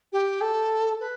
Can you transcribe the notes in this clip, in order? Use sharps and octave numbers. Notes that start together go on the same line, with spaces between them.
G4
A4
B4